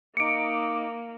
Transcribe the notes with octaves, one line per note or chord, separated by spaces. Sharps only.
A#3 D#4 D6 C#7 D7